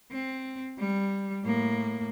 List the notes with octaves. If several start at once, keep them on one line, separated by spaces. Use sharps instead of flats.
C4
G3
A2 A#3